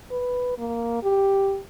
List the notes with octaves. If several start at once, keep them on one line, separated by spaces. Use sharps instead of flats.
B4
A#3
G4